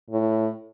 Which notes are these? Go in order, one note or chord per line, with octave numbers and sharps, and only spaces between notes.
A2